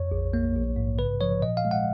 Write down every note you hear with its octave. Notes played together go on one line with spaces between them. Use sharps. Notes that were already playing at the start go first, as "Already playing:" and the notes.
Already playing: F2 C#5
A#1
A#3
A#1
G#2
C#3 B4
F3 C#5
A#2 D#5
F5
G#3
F#5